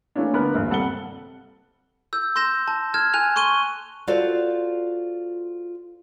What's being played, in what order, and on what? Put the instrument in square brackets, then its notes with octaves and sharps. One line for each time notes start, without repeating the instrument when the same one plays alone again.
[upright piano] E3 A3 A#3 C#4 D4
G1 B3 D4 A#4 B5 F#6
D#1 A#1 G2 A#3
C3 G3 A4 F#5 C#7 G7
[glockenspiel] E6 G6
C6 G6 A#6 E7
A5
F6 G#6 E7
G#5 F#6 F7
C6 C#6 F#6 D#7 G7
[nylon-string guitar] F4 F#4 A4 C5 D5